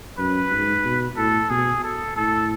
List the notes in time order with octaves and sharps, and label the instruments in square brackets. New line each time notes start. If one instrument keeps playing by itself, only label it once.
[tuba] F#2 [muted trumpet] B4
[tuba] G#2
B2
[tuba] A2 [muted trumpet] A4
[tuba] B2 [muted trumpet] G#4
[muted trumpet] A4
[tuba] A2 [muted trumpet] A4